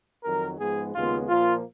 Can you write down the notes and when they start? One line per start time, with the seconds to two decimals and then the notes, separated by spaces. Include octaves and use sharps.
0.24 F2 D#3 F#3 A#4
0.58 G#2 F3 G#3 B3 G#4
0.94 D#2 C#3 G#3 B3 F4
1.29 A#2 F3 A#3 F4